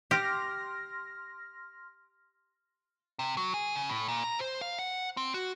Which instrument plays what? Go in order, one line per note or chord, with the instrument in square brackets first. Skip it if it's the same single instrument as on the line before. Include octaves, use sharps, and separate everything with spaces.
[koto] G4 [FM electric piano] C6 F6 A#6
[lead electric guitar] C3
F#3
G#4
C#3
A2
A#2
A#5
C5
F5
F#5
C4
F#4